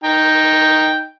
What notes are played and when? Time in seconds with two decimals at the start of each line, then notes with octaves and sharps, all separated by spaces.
0.04 D#4 G5